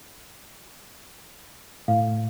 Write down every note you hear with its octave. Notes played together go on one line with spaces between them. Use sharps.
A2 F5